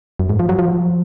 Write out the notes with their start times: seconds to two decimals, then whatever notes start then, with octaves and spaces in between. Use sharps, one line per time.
0.19 F#2
0.29 G#2
0.39 F3
0.49 F#3
0.59 F3